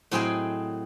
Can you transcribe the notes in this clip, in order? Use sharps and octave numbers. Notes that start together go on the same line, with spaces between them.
A2 F#3 C4 G#4 D#5 G5